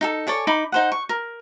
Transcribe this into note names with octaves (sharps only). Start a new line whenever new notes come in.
D#4 G4 A4
A4 C#5 D5 G#5
D#4 B5 D6
D#4 C5 F#5
C#6
A#4